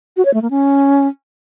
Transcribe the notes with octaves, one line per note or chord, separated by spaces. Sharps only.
F#4
C#5
A3
A#3
C#4